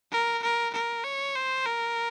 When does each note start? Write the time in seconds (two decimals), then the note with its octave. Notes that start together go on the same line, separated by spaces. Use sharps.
0.12 A#4
0.42 A#4
0.73 A#4
1.04 C#5
1.35 C5
1.66 A#4